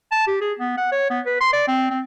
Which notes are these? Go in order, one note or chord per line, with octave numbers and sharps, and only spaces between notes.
A5
G4
G#4
B3
F#5
C#5
B3
B4
C6
D5
C4
C4